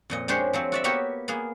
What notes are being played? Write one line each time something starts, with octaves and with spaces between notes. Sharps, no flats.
F2 A#2 D#5
G#3 D4 G4 C5 C#5
F3 F#3 C4
F#4 D5 E5
A#3 B3 F#4 G4 C#5 E5
A#3 B3 G#4